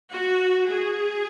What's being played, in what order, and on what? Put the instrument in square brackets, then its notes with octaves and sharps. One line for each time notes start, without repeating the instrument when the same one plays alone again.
[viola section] F#4
G#4